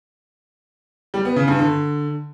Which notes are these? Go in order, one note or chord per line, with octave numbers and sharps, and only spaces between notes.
G3
B3
C#3
G2
D3